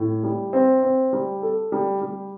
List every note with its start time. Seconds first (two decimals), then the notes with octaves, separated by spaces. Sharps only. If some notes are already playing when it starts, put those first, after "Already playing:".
Already playing: A2
0.23 G3
0.53 C4
0.83 C4
1.13 G3
1.42 A4
1.72 G3
2.01 G3